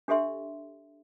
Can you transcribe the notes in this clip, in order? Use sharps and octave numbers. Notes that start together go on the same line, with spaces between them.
D4 G4 A4 E5 C6